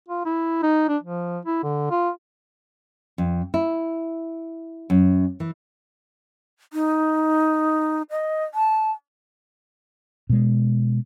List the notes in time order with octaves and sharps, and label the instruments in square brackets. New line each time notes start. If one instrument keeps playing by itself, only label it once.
[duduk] F4
E4
D#4
D4
F3
E4
D3
F4
[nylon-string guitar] F2
E4
F#2
E3
[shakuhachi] D#4
D#5
A5
[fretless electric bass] B2 G#3